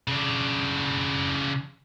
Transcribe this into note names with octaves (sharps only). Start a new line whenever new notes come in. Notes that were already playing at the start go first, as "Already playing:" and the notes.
C#3 D4